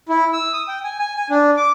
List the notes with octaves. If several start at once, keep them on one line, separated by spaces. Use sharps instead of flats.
E4
E6
D#6
G5
G#5
G#5
G#5
D4
D6